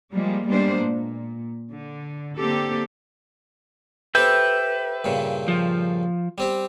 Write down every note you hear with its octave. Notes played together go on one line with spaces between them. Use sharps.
F3 G3 G#3 A#3
G3 G#3 A#3 B3 D4 C5
A#2
D3
D3 A#3 C4 G4 A4
G4 A4 B4 C5 E5 G5
G2 A#2 C#3
F3
G3 C4 G4